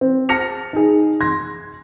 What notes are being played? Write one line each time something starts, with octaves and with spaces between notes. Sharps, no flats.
C4
A5 F6 A#6 C#7 F7
D#4 G#4
C6 G#6 A#6